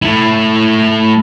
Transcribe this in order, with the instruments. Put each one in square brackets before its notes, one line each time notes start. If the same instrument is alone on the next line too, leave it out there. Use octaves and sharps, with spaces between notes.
[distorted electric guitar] A3 E4